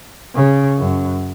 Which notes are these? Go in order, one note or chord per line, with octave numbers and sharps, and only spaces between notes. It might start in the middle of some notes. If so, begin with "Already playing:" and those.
C#3
F#2